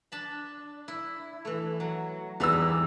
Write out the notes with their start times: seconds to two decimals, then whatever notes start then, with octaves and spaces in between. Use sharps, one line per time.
0.12 D4 A5 B5
0.88 E4
1.45 E3 A3
1.80 F#3
2.40 E2 G#2 E3 G3 E6